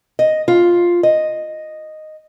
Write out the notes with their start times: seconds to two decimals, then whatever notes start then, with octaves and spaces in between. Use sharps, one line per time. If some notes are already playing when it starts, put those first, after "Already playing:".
0.19 D#5
0.48 F4
1.03 D#5